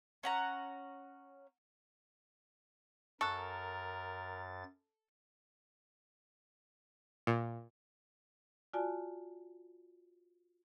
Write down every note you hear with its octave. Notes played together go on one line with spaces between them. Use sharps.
C#4 F#5 A#5
F#2 A4 A#4 C#6 F#6 A6
A#2
F4 F#4 D5 G#5 A5